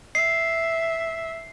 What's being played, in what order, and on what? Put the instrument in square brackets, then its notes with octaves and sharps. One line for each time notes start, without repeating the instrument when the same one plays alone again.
[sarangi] E5 [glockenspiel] C7